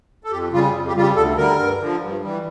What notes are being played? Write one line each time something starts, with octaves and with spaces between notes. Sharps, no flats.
A4
F2 G4
C#3 G3 F4
F2
G4
C#3 G3 F4
G4
D2 A4
D3 G3 A#4
G2
D3 F3
G2
E3 G3